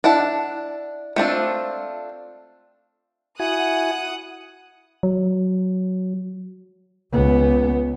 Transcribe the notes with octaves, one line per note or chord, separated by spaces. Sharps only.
D4 E4 F#5 A5
A3 C4 D4 F4
E4 F#4 F#5 G#5 D#6 F#6
F#3
C#2 B3